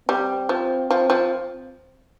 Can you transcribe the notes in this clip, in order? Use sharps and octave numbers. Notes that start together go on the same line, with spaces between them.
G3 C4
F3
F3
F3